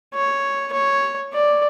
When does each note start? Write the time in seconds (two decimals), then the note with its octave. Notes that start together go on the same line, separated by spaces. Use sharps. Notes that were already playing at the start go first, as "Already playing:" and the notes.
0.14 C#5
0.73 C#5
1.33 D5